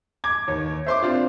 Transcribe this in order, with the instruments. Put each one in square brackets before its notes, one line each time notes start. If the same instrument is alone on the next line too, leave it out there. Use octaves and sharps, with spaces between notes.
[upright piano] D6 G#6
[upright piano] D#2 [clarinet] C#5
[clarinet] C5 [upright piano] E5 C6 D6
[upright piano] C4 D4 F4